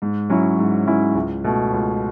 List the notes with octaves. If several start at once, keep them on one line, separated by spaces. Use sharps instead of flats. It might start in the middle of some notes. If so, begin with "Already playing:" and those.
G#2
F#3 C#4 E4
G#2
F#3 C#4 E4
C#2
B2 A3
C#2